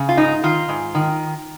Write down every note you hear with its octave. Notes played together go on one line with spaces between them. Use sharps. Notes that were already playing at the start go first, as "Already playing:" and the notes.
Already playing: C#3
F4
G#2 D#4
D#3 F4
G#2
D#3